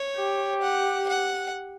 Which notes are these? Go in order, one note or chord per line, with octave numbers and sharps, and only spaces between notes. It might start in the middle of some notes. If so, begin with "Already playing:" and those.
Already playing: C#5
G4
F#5
F#5